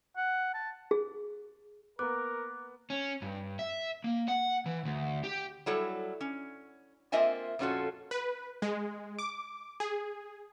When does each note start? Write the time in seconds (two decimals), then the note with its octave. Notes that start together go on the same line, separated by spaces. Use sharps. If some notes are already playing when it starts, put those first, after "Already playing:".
0.17 F#5
0.54 A5
0.91 G#4
1.99 A#3 B3 A#4 D6 F#6
2.90 C#4
3.22 G2
3.59 E5
4.04 A#3
4.28 F#5
4.66 E3
4.85 D2
5.24 G4
5.66 F#3 G3 E4 A4 C#5
6.21 C#4
7.12 A#3 C4 F4 D#5 E5 G#5
7.59 F2 A#2 C#4 F4 F#4 A4
8.11 B4
8.62 G#3
9.19 D6
9.80 G#4